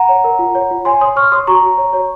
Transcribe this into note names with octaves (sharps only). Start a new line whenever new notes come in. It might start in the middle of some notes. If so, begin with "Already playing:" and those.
Already playing: F#5 A#5
C#5
A#4
F4
C#5
F4
C#5 G#5 C6
C#5 C6 D#6
C#5 C#6 F6
C#5 C6 D#6
F#4 A#5 C#6
F#4
C#5
C#5